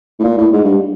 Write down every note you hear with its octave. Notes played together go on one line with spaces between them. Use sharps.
A2
A#2
A2
G#2
G2